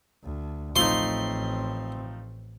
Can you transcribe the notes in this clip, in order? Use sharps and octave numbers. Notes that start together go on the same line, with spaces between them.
D2
A1 F3 A3 C4 D#4 C6